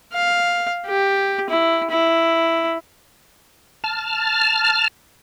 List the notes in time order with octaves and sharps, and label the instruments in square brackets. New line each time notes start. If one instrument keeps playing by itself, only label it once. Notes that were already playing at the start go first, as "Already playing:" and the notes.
[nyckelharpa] F5
G4
E4
E4
[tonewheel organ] A5 F6